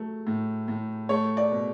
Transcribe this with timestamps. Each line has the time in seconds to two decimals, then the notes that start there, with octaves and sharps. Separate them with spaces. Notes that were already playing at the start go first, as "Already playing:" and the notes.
Already playing: F#3 A3
0.27 A2
0.68 A2
1.09 A3 C#5
1.37 D5
1.51 B2